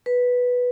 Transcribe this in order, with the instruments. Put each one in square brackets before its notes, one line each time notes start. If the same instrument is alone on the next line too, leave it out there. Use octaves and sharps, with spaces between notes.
[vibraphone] B4